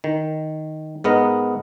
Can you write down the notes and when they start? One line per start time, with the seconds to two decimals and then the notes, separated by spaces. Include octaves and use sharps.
0.04 D#3
1.04 G#2 B3 A#4 D#5